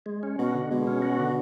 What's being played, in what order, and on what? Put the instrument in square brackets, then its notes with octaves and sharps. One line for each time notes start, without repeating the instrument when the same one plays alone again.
[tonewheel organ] G#3
C#4
[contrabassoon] B2 [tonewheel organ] F#4
[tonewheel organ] D3
[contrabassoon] B2 [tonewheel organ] G#3
[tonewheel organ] C#4
F#4
D3